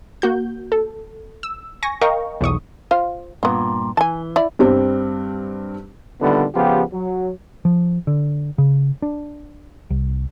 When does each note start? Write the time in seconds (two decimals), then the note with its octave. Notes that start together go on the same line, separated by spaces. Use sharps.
0.22 A#3 F#4 G6
0.72 A4
1.43 E6
1.83 G#5 C#6 A#6
2.01 A#4 D#5 F5 G5 A#5 C#6
2.41 B1 E2 C#6 D#6
2.91 F4 C5 F5
3.43 G2 A#2 B3 F4
3.97 E3 G#5 A5
4.36 E4 D5
4.59 G2 G3 C4 D4
6.21 A#2 D3 D#3 G3 A3 B3
6.55 C#3 F3 B3 F4 G4
6.92 F#3
7.65 F3
8.07 D3
8.58 C#3
9.02 D4
9.90 C2